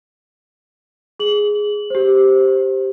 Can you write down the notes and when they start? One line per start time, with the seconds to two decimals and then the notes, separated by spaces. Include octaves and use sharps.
1.19 G#4 F#7
1.90 G4 C5